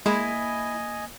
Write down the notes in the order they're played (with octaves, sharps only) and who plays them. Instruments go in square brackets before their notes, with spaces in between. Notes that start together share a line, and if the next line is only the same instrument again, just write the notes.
[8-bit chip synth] G#3 [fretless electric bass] A#3 [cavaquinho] E4 [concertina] D#5 G#5